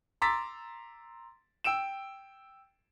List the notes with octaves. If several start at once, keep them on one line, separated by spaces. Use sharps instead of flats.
A#5 C6 D6 E6 A6 B6
G5 E6 D7 E7